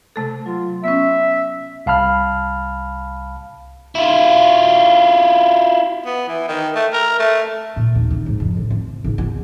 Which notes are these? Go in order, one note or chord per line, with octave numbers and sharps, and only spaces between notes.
C3 A3 A4
F#3 F4
B3 C#4 E5
C2 F5 A5 B5 F6
E4 F4
B3
E3
D#3
A3
A#4
A3
A#2
D#2
D#3
G#2
F2
A2
C3
G#1
E2